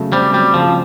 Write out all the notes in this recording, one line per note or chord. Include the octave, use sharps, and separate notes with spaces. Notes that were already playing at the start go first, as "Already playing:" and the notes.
Already playing: C#3 F#3 A3
G3 C4
F#3 G3
C#3 F3